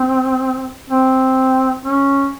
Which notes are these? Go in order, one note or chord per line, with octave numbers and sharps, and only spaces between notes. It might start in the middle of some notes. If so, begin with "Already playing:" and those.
Already playing: C4
C4
C#4